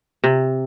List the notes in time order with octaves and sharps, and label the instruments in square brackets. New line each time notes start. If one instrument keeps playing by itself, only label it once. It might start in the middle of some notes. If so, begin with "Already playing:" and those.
[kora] C3